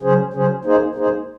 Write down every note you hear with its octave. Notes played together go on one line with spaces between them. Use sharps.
C#3 F#3 C#4 G#4 C5
C#3 F#3 C#4 G#4 C5
A#3 D#4 G#4 C5
A#3 D#4 G#4 C5